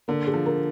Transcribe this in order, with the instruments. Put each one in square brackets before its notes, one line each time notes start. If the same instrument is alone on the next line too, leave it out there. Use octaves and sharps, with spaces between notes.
[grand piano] D3 [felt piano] A#3
[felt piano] G#4
[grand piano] F3
[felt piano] A#4